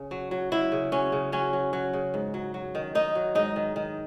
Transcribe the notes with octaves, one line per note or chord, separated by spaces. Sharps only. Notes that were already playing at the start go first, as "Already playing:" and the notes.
Already playing: C#3
F#3
F#3
F#3 E4
C#3
F#3 C#4
C#3
F#3 C#4
F#3
F#3
C#3
G#2
F#3
F#3
D#3
D#3 D#4
F#3
G#2 D#4
D#3
D#3